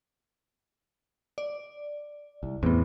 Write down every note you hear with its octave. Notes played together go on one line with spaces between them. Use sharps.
D5
C2
E2 A2 B3 C4